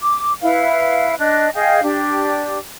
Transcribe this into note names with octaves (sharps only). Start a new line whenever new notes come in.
D6
E4 B4 F5
D4 D#5 F#6
G#4 D#5 F5 G5
D4 G4